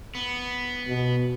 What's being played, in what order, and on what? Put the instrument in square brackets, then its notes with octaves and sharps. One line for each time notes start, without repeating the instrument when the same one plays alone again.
[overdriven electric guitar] B3
[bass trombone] B2